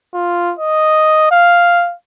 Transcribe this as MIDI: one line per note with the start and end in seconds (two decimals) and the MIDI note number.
0.14 0.54 65
0.59 1.31 75
1.32 1.94 77